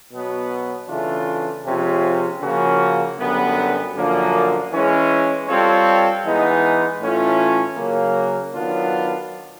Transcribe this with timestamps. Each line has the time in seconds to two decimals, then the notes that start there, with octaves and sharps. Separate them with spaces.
0.12 B2 F#3 B3
0.88 C#3 E3 A3 D4 F4
1.65 C3 F3 G#3 C#4 F4
2.42 C#3 F3 A#3 C#4 F#4
3.19 F#2 D3 G3 B3
3.95 F#2 D3 F3 A#3
4.71 E3 G#3 C#4
5.47 G3 C4 F4 A4 C#5
6.24 E3 G#3 B3 D#4
7.01 A2 E3 A3 C#4 F4
7.77 C#3 F#3 A#3
8.53 D#3 F#3 B3 D4 F4